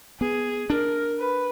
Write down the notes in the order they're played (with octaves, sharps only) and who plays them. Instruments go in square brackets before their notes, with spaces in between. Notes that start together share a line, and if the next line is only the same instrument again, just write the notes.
[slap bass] B3 [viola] G#4
[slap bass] D4 [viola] A#4
[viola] B4